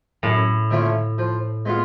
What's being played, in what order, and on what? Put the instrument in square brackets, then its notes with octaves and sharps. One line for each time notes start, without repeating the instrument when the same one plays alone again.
[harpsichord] F#2 [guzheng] A2
[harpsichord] D3 F3 A3 C#4
F3
G#3 B3 F4